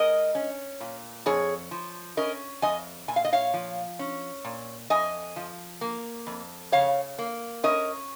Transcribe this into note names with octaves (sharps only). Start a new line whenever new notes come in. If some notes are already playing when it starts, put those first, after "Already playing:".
Already playing: G#3 A#4 D#5
C#4
A#2
F2 G#4 C#5
F3
C#4 A#4 D#5
F2 D#5 G#5
A#2 G#5
F5
D#5
C#5 F5
F3
C#4
A#2
F2 D#5 G#5
F3
A#3
F2
C#3 C#5 F5
A#3
C#4 A#4 D#5